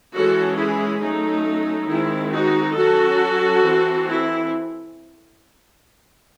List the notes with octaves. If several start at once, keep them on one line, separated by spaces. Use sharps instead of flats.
E3 G#3 C#4 F#4 A4
E4 G#4
F#3 A3 C#4 D#4
D#3 G#3 C4 E4
D#4 F#4
F#3 C#4 F#4 A4
E3 C4
E4